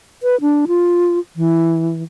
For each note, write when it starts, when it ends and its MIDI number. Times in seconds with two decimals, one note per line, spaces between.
0.23 0.40 71
0.41 0.66 62
0.68 1.19 65
1.36 2.03 52